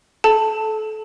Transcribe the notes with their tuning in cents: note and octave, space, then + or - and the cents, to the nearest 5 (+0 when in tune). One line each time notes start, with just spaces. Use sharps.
A4 -25 A5 +10